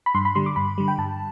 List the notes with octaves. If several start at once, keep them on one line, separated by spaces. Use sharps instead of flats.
B5
G2 C6
B5
D3 G3 C6
D6
G2 B5
D3 G3
G5
G2 A5